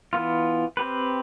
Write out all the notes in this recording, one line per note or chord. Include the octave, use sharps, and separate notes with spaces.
E3 B3 F4
C4 G4 B4